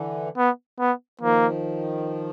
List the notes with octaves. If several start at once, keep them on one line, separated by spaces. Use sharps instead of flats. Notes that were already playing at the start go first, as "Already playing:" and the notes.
Already playing: D3 E3
B3
B3
D#3 F3 A#3